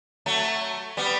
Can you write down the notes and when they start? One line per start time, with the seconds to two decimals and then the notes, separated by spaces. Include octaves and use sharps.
0.26 F#3 A3
0.97 G3 B3